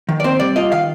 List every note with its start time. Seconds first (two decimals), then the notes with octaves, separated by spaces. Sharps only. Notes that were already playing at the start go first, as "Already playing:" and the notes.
0.09 D#3
0.20 D5
0.24 C4 C5
0.40 G3 D5
0.56 F4 D#5
0.72 D#3 F5